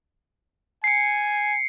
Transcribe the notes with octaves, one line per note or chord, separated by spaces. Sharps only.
G#5 C7 C#7